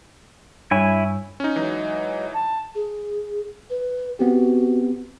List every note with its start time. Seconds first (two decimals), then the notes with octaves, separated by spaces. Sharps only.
0.71 G2 E4 C#5 G#5
1.40 C#4 D#4
1.56 E3 F#3 G#3 D#4
2.34 A5
2.75 G#4
3.70 B4
4.19 B3 C4 F#4 G4